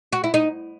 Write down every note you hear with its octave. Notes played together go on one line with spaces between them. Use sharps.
F#4
E4
D#4